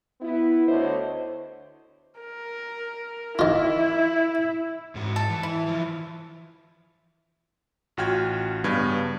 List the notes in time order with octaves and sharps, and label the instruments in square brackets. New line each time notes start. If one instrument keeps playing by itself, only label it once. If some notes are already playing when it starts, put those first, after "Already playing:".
[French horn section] B3 E4
D2 D3 C5 C#5 D#5
[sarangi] A#4
[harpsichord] D#3 F4 [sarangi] E4
[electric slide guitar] G#2 F#4
[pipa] A4
[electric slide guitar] E3
[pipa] E4
[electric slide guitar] E3 F3
[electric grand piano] A1 F4 F#4 G5 F6 G#6
G2 C#3 B3 G#6